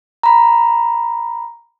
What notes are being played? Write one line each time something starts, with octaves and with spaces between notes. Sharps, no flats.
A#5 B5